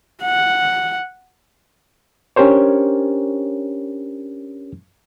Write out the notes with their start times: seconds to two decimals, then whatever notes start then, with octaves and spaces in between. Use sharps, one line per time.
0.23 F#5
2.36 C#4 D4 G4 A#4 C5 C#5